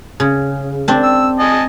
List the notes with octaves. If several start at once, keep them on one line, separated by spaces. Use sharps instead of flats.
C#3
C4 D4
E6
D#5 G#5 A5